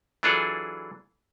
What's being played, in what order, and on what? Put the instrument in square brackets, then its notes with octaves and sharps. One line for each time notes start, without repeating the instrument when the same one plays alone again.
[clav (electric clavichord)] E3 F#3 D4 F4 G#4 A4